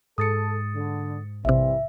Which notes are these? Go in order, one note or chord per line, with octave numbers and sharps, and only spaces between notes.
G#2 A4 D#6 A6 C#7
D3
A#1 C3 E3 G3 C4 E5